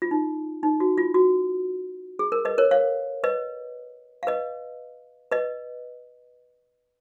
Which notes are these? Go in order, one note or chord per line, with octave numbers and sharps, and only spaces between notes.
F4
D#4
D#4
F#4
F4
F#4
G#4
A#4
B4 D#5
A#4 C#5
C#5 F5
B4 D#5
F5
B4 D#5
B4 D#5